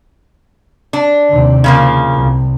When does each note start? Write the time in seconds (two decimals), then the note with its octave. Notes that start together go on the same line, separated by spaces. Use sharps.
0.93 D4
1.30 D#2 C3
1.64 C#3 F3 A#3
2.12 C2